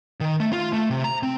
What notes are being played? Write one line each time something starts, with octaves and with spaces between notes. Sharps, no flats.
D#3
A3
F4
A3
C3
A#5
C4